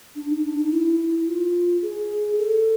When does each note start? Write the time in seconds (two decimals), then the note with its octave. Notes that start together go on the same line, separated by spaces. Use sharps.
0.15 D4
0.29 D#4
0.44 D4
0.57 D#4
0.71 E4
1.27 F4
1.82 G#4
2.38 A4